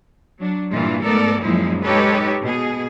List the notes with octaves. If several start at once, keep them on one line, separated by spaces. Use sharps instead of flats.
F#3 D4
G2 A#2 E3 F4
G#2 A3 B3 A4 A#4 D5
F#2 A#2 F3 G#3 D#4 E4
G#3 D#4 G4 A4 B4 C#5
B2 G#4